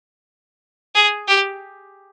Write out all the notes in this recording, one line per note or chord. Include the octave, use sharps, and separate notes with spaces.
G#4
G4